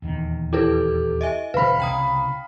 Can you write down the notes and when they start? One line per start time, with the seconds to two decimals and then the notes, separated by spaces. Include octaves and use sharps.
0.02 D#1 E2 D#3
0.53 E4 G4 A4 B4
1.21 D#5 E5 G#5
1.54 E1 D3 G3 B4 C5 F5 B5
1.80 C2 C#3 G5 A#5 D#6